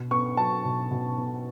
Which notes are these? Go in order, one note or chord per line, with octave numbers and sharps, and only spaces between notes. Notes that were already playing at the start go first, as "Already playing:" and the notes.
Already playing: B2
B3 C#6
F#3 A5
B2
B2
B3